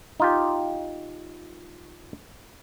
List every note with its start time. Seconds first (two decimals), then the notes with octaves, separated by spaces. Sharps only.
0.20 D#4 F4 G4